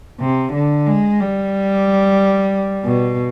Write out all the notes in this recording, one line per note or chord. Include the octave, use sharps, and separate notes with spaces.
C3
D3
G#3
G3
B2